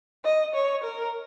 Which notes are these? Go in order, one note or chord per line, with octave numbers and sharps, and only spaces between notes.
D#5
C#5
A#4